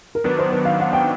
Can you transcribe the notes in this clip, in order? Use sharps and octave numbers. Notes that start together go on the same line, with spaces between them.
A#4
D#3 F#3 B3 D4 B4
C5
B4
F5
F#5
G5